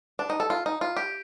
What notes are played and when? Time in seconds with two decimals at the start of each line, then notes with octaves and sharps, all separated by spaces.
0.19 D4
0.30 D#4
0.40 A4
0.50 F4
0.66 D#4
0.81 F4
0.96 G4